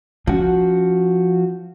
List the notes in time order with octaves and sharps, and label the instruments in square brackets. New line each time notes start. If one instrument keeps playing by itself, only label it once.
[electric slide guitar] F3 F#4 [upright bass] C#4